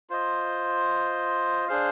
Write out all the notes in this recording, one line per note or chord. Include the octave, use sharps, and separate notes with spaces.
F4 C5 D#5
D4 G#4 C5 F5